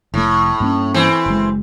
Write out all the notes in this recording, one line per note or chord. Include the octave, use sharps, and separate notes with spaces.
F1 A2 A3
G2 A#3 C#4
E3 C4
F#1 G#3